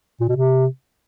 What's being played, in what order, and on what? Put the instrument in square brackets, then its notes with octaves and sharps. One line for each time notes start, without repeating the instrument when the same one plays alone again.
[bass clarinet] A#2
B2
C3